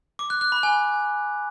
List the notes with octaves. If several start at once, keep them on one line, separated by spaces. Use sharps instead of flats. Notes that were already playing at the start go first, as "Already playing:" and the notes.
D6
F#6
F#6
B5
G#5